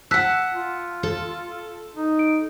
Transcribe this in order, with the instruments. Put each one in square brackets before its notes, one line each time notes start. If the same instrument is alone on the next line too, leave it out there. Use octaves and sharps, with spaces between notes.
[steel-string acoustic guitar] F#5 A5 [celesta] E6 F#6 B6
[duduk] F4
[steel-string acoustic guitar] A4
[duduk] D#4
[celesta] D7